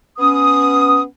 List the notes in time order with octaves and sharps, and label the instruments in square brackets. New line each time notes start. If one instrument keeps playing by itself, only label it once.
[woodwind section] B3 C#4 D#6